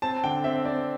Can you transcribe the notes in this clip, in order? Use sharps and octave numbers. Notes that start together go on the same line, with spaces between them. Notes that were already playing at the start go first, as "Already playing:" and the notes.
C4 A5
D3 G5
C4 E5
C4 D5